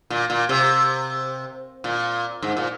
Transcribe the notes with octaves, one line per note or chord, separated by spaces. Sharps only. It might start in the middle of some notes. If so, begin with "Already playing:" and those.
A#2
A#2
C3
A#2
G#2
A#2